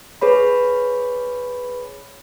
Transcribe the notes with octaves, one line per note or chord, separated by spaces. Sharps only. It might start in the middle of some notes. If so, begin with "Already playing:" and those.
G#4 B4 C#5 B5